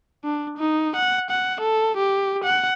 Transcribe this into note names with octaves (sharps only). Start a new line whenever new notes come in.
D4
D#4
F#5
F#5
A4
G4
F#5